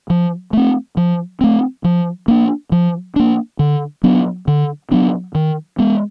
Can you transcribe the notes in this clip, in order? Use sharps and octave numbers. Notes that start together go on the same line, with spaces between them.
F3
A3 C4
F3
A3 C4
F3
A#3 D4
F3
A#3 D4
D3
F#3 B3 D4
D3
F#3 B3 D4
D#3
G#3 B3